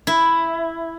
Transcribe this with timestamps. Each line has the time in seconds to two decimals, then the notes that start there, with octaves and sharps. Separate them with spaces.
0.07 E4